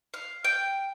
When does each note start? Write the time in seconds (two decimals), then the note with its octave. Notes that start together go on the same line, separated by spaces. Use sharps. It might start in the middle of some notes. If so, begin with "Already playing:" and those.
0.14 F5
0.44 G5